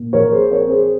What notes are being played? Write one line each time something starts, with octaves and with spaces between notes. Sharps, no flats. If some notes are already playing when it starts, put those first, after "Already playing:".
Already playing: A#2
A#1 A#4 C#5
G#4 C5
C4 A#4 C#5
G#4 C5